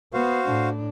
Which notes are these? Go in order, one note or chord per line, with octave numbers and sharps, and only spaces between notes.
B3 F#4 C5 F5
A2 D4